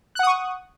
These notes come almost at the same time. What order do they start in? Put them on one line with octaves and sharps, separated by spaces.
F#6 F#5 D#6 C#6